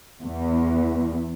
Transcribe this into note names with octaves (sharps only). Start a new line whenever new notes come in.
E2